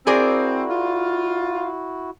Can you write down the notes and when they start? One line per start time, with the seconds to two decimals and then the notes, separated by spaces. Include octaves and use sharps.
0.07 C4 E4 F#4 G#4 A#4 D5
0.70 F4